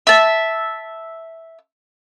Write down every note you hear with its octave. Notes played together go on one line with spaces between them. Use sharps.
E5 A5